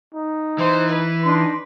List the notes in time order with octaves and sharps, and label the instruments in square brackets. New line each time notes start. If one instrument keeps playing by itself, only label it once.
[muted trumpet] D#4
[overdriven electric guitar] E3 [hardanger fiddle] C5
[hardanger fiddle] B4
[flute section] D4 D#4 [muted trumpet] C6